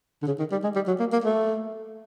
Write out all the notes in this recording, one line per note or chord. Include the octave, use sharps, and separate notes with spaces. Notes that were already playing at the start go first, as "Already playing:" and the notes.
D3
C#3
D#3
G3
G#3
G3
F#3
A#3
A#3
A3